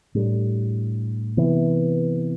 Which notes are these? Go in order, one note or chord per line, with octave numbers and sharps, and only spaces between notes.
A2 G3 D4
C3 E3 B3